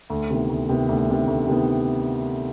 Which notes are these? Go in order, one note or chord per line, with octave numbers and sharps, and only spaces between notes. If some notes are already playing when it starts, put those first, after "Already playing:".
D2
C3 D#3 B3
D2
C3 D#3 B3
D2
C3 D#3 B3
D2
C3 D#3 B3